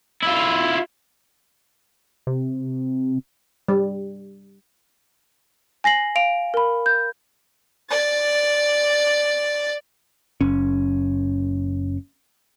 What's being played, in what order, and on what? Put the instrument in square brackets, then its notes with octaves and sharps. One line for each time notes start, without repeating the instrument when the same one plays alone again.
[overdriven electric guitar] E4 F4
[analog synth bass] C3
[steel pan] G3
[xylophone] G#5 A#6 C7 F#7
F5 D7 F7
A#4 B5
G6
[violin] D5 A6
[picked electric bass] F#1 C#4